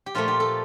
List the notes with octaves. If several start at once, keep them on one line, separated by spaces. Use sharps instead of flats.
G4
A#2 F3 A3 F4
G4
A4